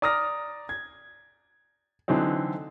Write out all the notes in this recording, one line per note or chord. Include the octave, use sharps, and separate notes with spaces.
D5 A#5 D#6 F6 A#6
G#6
D3 E3 F#3 C4 D#4